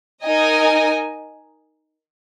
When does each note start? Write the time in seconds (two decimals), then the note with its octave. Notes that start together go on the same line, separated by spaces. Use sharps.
0.24 D#4 A#4 D#5 G#5